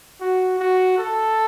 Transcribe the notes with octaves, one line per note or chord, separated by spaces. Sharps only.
F#4
F#4
A4